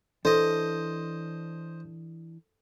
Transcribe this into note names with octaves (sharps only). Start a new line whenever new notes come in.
E3 D4 A4 C5 D#5